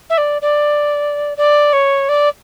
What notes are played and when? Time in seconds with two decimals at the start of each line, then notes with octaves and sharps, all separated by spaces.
0.10 E5
0.17 D5
0.41 D5
1.37 D5
1.73 C#5
2.09 D5